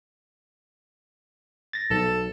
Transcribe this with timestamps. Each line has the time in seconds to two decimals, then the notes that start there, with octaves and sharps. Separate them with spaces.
1.73 A6 A#6
1.90 B1 A4